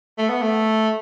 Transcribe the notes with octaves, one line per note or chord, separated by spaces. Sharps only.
A3
B3
A3